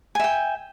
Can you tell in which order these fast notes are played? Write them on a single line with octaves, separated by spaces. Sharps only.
G#5 E5 G5